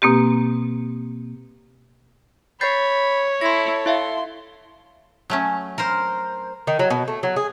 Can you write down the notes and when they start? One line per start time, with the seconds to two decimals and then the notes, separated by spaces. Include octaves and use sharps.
0.02 B2 A#3 C4 G4
2.61 C#5 B5 G6 A6 C7
3.41 E4 A4 C6 A#6
3.86 E4 E5 F5 C6
5.30 F#3 A3 C#4
5.78 A#4 C5
6.67 D#3
6.79 F#3
6.90 B2
7.08 A3
7.23 F#3
7.36 G#4